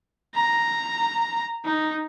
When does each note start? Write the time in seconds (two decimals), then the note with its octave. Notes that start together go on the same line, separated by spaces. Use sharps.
0.35 A#5
1.65 D#4